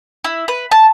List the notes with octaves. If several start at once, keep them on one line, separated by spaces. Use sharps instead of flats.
E4
B4
A5